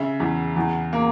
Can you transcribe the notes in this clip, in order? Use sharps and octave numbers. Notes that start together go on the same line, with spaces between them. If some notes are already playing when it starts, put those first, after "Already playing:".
Already playing: C#3 E5
E2
E2
A#3